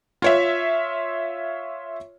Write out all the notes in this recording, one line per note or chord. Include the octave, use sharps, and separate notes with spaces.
F4 C#5 E5